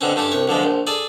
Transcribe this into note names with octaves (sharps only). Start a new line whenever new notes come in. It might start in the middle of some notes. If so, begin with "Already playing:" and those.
B2 D3 C4 C#4
G2 A3 C#4 G4
C2 C#5
B1 D3 F3 G#3
A#1
G#4 A4 D5 G#5